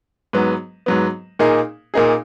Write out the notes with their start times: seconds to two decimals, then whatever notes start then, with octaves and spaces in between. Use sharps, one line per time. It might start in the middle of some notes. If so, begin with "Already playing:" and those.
0.33 G#2 F#3 B3
0.86 G#2 F#3 B3
1.39 A#2 A#3 D#4 G#4
1.94 A#2 A#3 D#4 G#4